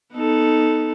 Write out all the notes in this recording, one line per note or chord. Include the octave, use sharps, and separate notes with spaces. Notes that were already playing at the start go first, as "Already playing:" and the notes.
B3 D#4 A4